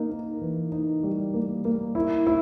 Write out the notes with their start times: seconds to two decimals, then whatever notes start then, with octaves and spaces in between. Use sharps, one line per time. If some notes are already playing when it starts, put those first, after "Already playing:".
Already playing: A#3 D#4
0.11 D#4
0.41 E3
0.72 D#4
1.03 G3
1.34 A#3
1.65 A#3
1.95 E4
2.27 E4